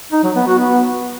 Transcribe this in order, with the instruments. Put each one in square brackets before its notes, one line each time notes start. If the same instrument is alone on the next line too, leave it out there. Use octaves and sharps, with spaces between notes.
[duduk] D#4
F#3
B3
F#4
B3